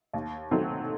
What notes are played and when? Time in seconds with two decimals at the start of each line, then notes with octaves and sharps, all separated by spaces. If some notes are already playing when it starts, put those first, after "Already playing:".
0.13 D#2
0.51 D#3 F#3 A3 C4